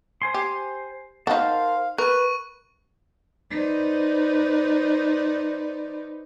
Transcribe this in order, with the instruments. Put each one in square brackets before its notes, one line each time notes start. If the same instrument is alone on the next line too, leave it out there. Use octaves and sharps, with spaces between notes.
[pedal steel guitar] C5 G#5 C6
[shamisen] G4
[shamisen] D#4 F#4 [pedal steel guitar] A#4 C5 A5 [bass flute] F5
[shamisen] A#4 [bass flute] B4 [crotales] C#6 D#7 [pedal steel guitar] F#6
[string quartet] D#4 B4 C5 D5